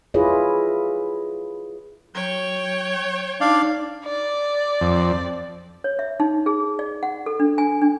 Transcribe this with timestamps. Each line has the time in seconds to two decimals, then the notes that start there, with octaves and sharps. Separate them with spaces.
0.14 E4 F4 G#4 B4 C#5 D#5
2.15 F#3 C#5 G5
3.41 D4 D#4 D5 F5
4.05 D5
4.81 F2
5.84 C#5
5.99 E5
6.20 D#4
6.46 G#4
6.79 D5
7.03 F#5
7.26 A4
7.40 D4
7.58 G#5
7.82 D4